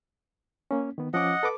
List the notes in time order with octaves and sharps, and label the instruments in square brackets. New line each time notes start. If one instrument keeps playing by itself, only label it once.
[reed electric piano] A#3 C#4
D#3 B3
[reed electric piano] F3 C#4 D6 [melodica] D#5 F#5
[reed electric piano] A4 B4 D6